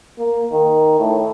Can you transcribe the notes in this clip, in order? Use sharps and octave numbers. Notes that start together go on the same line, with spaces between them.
A#3
D#3
A2